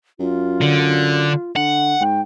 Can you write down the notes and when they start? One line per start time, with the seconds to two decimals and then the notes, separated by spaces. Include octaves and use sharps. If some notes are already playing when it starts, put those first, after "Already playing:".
0.20 F#2 F4
0.61 D3
1.56 D3 F#5
2.01 G#2 G5